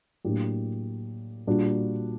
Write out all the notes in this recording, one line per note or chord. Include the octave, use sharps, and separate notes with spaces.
A2 F#3 A#3 D4 G4
A#2 G3 A#3 D4 F#4